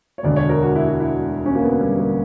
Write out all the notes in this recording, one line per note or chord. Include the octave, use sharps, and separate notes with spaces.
C#5
E1 D2 D3 D5
C#5
A#4
F#4
E4
F#4
E4
C#4
A#3
B3
G3
A#3